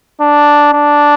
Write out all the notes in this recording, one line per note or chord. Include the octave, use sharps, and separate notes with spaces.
D4
D4